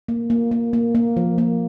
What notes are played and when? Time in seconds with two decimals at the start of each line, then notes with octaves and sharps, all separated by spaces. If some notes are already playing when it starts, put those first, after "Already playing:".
0.08 A#3
0.30 A#3
0.51 A#3
0.73 A#3
0.95 A#3
1.17 F3
1.38 A#3